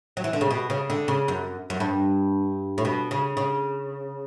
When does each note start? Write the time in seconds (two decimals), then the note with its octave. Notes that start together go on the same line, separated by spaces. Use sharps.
0.17 F#3
0.24 E3
0.33 D3
0.41 C#3
0.50 B2
0.70 C#3
0.90 D3
1.08 C#3
1.28 F#2
1.70 F#2
1.80 G2
2.78 A2
2.85 B2
3.11 C#3
3.37 C#3